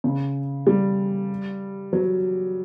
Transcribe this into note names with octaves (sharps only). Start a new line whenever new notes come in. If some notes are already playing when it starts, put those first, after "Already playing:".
C#3
G3
F#3